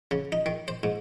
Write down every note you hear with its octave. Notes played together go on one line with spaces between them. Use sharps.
C#3
D#4
D#3
C5
G#2